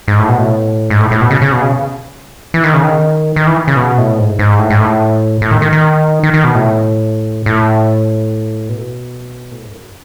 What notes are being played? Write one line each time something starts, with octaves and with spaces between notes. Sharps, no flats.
G#2
A2
B2
A2
G#2
A2
A2
B2
C#3
C#3
B2
C#3
E3
D#3
C#3
D#3
D#3
E3
C#3
B2
A2
G#2
G#2
A2
G#2
A2
A2
D#3
D#3
D#3
D#3
D#3
B2
A2
A2
B2
A2
G#2
F#2